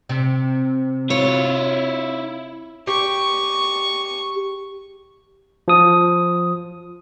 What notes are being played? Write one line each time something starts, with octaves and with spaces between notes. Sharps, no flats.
C3
E4 F4 C#5
G4 C#6
F3 D#6